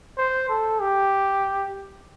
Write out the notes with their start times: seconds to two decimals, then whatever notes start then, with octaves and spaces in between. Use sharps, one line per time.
0.18 C5
0.49 A4
0.81 G4